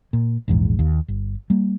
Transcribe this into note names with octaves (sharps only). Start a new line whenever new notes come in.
A#2
A#1 E2 G#2
D#2
G1
G3 A#3